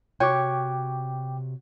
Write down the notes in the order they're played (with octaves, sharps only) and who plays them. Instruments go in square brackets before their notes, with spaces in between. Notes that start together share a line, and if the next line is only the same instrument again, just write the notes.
[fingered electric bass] C3 [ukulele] F#4 C#5 [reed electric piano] G5 D6